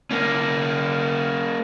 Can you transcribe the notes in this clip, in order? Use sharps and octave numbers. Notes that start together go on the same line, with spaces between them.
A#3 C#4